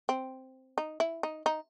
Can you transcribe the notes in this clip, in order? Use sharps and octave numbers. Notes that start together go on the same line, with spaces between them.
C4
D#4
E4
D#4
D#4